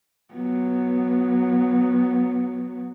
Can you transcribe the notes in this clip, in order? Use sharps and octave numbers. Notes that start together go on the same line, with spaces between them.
F#3 B3